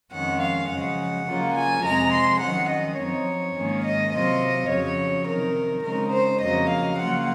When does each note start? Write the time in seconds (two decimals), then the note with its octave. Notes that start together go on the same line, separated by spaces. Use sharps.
0.13 F2 D#3 G#3 C#4 F#5
0.41 F5
0.69 F#2 C#3 F3 G#3 F#5
1.26 C#3 F#3 A#3 F4
1.55 G#5
1.84 F2 C3 F3 G#3 A#5
2.13 C6
2.41 D#3 F#3 C#4 F#5
2.70 D#5
2.98 F#2 F3 C4 D#4 C#5
3.56 G#2 D#3 A#3 C#4
3.84 D#5
4.12 C3 F#3 C4 F4 D#5
4.70 F2 C#3 F#3 C#5
5.27 C3 D#3 F#3 A#4
5.84 C#3 G#3 C4 D#4 A#4
6.13 C5
6.42 F2 C#3 F#3 A#3 D#5
6.70 F5
6.98 C#3 F#3 A#3 F4 F#5